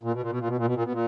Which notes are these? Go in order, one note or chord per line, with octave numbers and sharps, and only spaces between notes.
A#2
B2
A#2
B2
A#2
B2
A#2
B2
A#2
B2
A#2